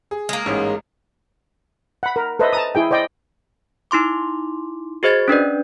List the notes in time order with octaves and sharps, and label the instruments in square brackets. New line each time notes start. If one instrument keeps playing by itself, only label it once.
[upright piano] G#4
[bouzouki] G#3 A#3
[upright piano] A1 G#2 C#4
[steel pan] F#5 B5
A#4
A4 B4 C5 D#5 E5
A5 A#5 D#6
E4 G#4 G5
C5 D5 D#5 G5
[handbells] D#4 E4 C6 D6
F#4 G#4 C5 D#5 G#6 A6
C#4 D4 B4 D5